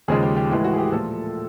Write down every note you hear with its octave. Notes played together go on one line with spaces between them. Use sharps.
D#2 C#3 F3 G#3 G#4
G4
G4
A2 E3 G#3
F#4
G#4
G4
A#2 F3 A3 A4